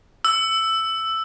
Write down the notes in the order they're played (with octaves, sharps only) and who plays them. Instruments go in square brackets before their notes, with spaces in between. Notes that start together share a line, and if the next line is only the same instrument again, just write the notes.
[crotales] E6